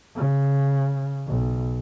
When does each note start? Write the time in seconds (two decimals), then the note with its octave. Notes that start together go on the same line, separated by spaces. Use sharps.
0.17 C#3
1.28 B1